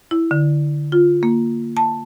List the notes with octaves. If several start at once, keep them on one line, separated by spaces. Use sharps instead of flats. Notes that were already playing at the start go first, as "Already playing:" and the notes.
E4
D3
F4
A#3
A5